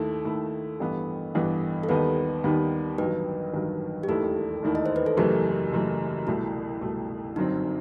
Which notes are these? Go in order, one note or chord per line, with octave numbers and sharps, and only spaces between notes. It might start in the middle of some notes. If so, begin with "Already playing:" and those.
Already playing: D#2 D#3 A3 E4 A4
D#2 D#3 A3 E4
A1 G2 E3 B3
A1 G2 E3 B3
A4
D#2 D#3 G3 B3 D#4 B4
D#2 D#3 G3 B3 D#4
A1 G2 D#3 F#3 B4
A1 G2 D#3 F#3
G4
E1 D#2 D#3 A3 E4 A4
E1 D#2 D#3 A3 E4
D#5
C5
B4
A4
F#1 F#2 E3 A3 G4
F#1 F#2 E3 A3
C2 B2 A3 E4
C2 B2 A3
G1 F#2 F#3 C4 D#4